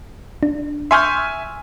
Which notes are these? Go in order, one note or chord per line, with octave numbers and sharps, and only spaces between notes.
D4
E5 G#5 C6 C#6 F6 G6